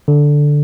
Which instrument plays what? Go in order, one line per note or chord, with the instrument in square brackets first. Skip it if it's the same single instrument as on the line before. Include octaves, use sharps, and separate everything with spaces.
[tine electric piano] D3